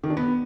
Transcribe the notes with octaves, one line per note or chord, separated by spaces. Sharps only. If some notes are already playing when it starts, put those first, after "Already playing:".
D#3
D4
B3